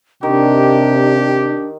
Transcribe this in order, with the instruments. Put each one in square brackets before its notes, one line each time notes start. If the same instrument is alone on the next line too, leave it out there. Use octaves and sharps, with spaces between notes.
[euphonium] C3 [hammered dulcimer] D#3 [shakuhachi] D4 [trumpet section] G4